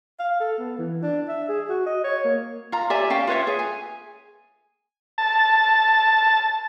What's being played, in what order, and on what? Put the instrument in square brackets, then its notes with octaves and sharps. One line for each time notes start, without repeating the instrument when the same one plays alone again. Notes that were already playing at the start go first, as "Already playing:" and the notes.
[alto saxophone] F5
A4
B3
E3
D4
E5
G#4
F#4
D#5
C#5
A#3
[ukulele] F4 A#5
G4 D5 E5 G#5
C#4 F5 G5
F4 B4 C#5 E5
G#4
G#5
[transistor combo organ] A5